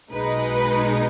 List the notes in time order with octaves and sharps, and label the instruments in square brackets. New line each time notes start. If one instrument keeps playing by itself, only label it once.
[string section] B1 B2 G#3 D#4 B4